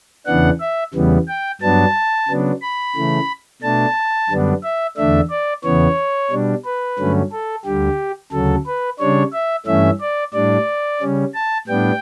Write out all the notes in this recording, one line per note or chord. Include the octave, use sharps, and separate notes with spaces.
E2 C#3 E3 B3 D4 F#5
E5
E2 C#3 E3 G3 B3
G5
G2 F#3 B3 D4 A5
C#3 F#3 B3 D4
B5
C#3 E3 A3
B2 A3 D4 A5
F#2 D3 G3 B3 D4
E5
E2 D3 A3 D4 E5
D5
E2 C#3 E3 B3 C#5
B2 G3 D4
B4
G2 D3 F#3 A3 C#4
A4
D2 D3 G3 G4
D2 C#3 F#3 A4
B4
C#3 G3 D4 C#5
E5
G2 E3 A3 C#4 E5
D5
A2 G3 D4 D5
C#3 G3 C#4
A5
A2 G3 B3 D4 G5